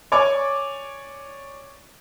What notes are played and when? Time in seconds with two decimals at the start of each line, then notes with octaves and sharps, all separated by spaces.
0.12 C#5 D5 G#5 C#6 D6